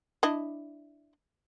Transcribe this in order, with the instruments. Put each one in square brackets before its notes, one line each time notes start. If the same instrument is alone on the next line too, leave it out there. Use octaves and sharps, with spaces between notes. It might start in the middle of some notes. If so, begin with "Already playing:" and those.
[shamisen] D4 E4 D#5